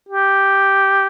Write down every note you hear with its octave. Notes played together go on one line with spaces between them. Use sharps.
G4